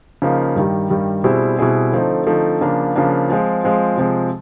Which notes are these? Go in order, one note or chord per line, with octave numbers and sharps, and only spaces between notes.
C#3 F3 A#3 D#4
G2 D#3 G3
G2 D#3 G3
B2 G3 C4 E4 G#4
B2 G3 C4 E4 G#4
D3 F3 A3 C4 D#4
D3 F3 A3 C4 D#4
C#3 F3 A#3 D4
C#3 F3 A#3 D4
F3 G#3 C4 F4
F3 G#3 C4 F4
C3 F3 G#3